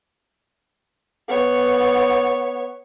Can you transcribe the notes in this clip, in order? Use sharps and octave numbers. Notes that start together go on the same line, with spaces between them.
B3 C#5